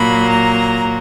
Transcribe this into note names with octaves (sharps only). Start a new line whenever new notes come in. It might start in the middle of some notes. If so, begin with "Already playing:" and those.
Already playing: A#2 F#3 A#3 B5
A#5